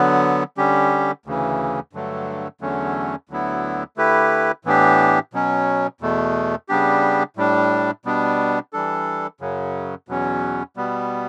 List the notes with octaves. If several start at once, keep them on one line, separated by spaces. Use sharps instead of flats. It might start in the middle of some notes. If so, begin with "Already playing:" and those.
Already playing: D3 F#3 B3
D3 G3 C#4 G4
D2 C#3 E3
G2 D3 F#3 A3
E2 D3 F#3 A3 C#4
D2 D3 F#3 B3 E4
D3 A3 E4 G4 B4
A2 E3 B3 D4 G4
B2 F#3 C#4
E2 B2 A3
C#3 G3 B3 D4 G4
A2 G3 D4
B2 G3 B3 D4
E3 G3 D4 A4
F#2 C#3 F#3
E2 B2 F#3 C#4
B2 G3 B3